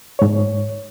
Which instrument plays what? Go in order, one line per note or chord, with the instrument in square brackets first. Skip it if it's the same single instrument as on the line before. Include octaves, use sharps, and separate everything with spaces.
[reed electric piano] G#2 C#5